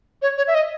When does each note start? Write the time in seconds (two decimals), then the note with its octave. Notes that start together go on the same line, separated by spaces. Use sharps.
0.22 C#5
0.38 C#5
0.47 E5
0.55 D#5